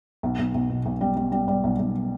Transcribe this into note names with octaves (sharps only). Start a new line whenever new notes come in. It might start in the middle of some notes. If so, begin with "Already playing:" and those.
B1
B1
B1
B2
B1
G3
G3
G3
G3
B1
B1